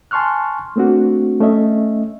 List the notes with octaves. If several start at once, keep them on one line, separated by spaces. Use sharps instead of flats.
G#5 A5 C6 C#6 F6 F#6
A3 A#3 C4 D4 F#4
A3 C#4 D#5 E5